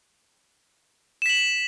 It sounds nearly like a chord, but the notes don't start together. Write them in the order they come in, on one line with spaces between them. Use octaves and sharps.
E7 B6 F#7